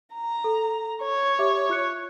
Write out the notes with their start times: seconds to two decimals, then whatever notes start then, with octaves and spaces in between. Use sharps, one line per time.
0.14 A#5
0.44 A4
1.03 C#5
1.39 G4 E5 D6
1.69 F4 F#6 C#7